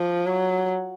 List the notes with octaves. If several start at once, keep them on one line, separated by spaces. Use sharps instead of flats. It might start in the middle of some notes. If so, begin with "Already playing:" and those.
Already playing: F3
F#3